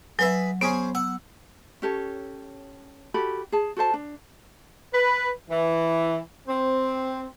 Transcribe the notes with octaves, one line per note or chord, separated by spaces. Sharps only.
F#3 G#4 B4 E5
B3 C#4 G#4 C5
F#5 E6
C#4 G4 A4 C#5
F#4 G4 A4 B5
G#4 A5
F#4 A4 C5 A5
D4
B4
E3
C4